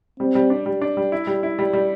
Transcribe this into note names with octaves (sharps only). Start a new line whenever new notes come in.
G3 C4
G3
D4
G3
D4
G3
E4
G3
E4
G3
G3